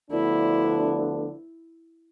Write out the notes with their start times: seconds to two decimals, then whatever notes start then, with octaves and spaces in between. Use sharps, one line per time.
0.11 D2 D3 F3 B3 D4 E4